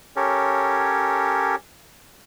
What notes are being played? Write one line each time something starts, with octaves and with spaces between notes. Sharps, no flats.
C#4 G4 A4 A#4 C#5